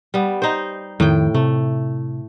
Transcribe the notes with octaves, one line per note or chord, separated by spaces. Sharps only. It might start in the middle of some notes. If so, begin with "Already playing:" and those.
G3 B3
D#4 C5
F2 A2 D#3 G5
C3 A3